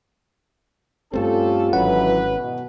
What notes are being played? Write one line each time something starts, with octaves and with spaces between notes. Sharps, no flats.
G2 A3 C4 C#4 F4 G4 A4
G#1 D3 E3 F#3 C#4 B4 F#5
B2